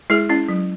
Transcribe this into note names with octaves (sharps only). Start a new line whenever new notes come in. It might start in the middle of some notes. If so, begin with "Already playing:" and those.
G#3 E4 G#4
C#4 E4
F#3